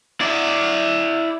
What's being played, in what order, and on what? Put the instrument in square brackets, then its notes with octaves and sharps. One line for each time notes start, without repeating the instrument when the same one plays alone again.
[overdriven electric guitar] E4 D5